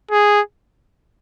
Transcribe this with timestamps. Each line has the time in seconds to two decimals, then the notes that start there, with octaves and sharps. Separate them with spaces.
0.11 G#4